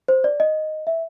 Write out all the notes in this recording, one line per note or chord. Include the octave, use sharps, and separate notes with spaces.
C5
D5
D#5
E5